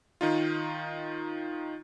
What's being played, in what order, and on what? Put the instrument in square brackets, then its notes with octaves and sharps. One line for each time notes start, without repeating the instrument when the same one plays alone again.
[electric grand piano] D#3 D#4 F4